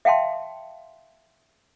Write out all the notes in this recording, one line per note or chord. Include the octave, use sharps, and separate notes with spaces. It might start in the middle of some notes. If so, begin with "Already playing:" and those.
E5 F5 G5 A5 C6